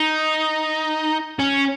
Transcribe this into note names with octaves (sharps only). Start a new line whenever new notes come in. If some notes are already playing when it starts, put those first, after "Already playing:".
Already playing: D#4
C#4